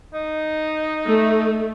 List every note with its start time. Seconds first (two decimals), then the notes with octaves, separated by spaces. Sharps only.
0.13 D#4
1.06 A3